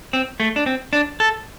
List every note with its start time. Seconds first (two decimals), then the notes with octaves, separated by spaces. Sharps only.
0.13 C4
0.40 A3
0.56 D4
0.66 C4
0.93 D4
1.20 A4